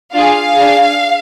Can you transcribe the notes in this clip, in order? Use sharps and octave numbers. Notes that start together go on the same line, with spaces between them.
D4 F4 G#4 F5
D4 G#4